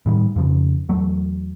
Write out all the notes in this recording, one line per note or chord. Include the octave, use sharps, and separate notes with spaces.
A2 D#3 G3
F2 C#3 F3
E2 F#3 A3